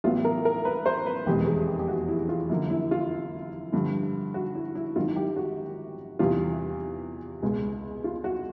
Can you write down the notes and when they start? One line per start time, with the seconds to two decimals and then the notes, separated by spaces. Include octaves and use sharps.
0.04 A1 A2 F#3 B3 F4
0.25 A#4
0.45 A#4
0.65 B4
0.86 C5
1.06 B4
1.26 F1 E2 B2 G#3 G4
1.47 G#4
1.68 G4
1.79 G4
1.88 F#4
2.08 E4
2.29 F4
2.49 F#2 D3 F3 A#3
2.70 E4
2.91 F4
3.73 G2 D3 F3
4.34 F#4
4.55 E4
4.75 E4
4.96 G#1 F#2 D#3 F#3 F4
5.16 G4
5.36 F#4
6.19 E2 C3 E3 G3 F4
7.42 C#2 B2 G#3
8.04 F4
8.24 F#4